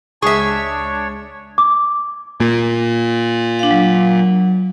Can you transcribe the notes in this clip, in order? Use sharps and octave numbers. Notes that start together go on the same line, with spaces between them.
C#2 G#3 D4 G#4 C#5 E5 C#6 D#6
D6
A#2
D4 F5
F#3